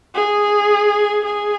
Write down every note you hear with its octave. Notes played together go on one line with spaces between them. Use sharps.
G#4
G#4